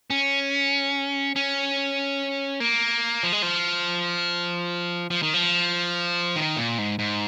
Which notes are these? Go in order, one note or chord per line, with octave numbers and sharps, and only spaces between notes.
C#4
C#4
A#3
F3
G#3
F3
F3
D#3
F3
D#3
A#2
G#2
G#2